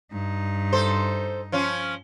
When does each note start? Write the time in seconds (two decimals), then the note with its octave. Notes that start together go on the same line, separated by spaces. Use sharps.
0.12 G2 D#4
0.73 A4 C5
1.52 F3 C#4 F4